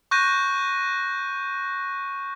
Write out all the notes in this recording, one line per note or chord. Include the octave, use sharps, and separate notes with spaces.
C#6 F#6 G6 A#6 D#7